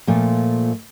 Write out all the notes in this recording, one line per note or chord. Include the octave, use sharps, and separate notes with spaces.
A#2 F3 A3